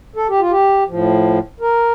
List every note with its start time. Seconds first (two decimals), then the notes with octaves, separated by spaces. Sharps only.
0.16 A4
0.29 G4
0.40 F4
0.51 G4
0.88 A2 F3
1.60 A#4